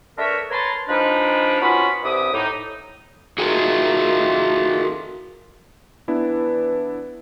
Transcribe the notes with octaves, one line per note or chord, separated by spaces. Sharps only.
A3 D4 A#4 B4 C#5 E5
A#4 B4 C#5 A5 A#5 C6
F3 G#3 D4 D#4 A#4 B4
B3 C#4 F4 F#4 B5
C2 G2 E5 D6 D#6
A2 D#4
D#3 A3 F4 F#4 G#4 A#4
E3 B3 D4 E4